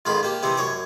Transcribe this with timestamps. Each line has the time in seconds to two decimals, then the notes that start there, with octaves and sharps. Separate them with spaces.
0.05 F2 G#2 D#3 F4 B5
0.23 A#3 G4
0.43 C3 E3 C4 D#4
0.57 F#2 C#5 D6